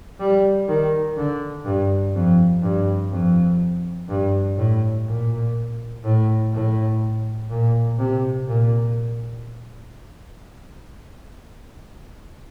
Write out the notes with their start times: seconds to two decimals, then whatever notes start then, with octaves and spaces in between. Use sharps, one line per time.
0.20 G3
0.69 D#3
1.17 D3
1.66 G2
2.15 F2
2.63 G2
3.11 F2
4.09 G2
4.58 A2
5.07 A#2
6.04 A2
6.53 A2
7.50 A#2
7.99 C3
8.49 A#2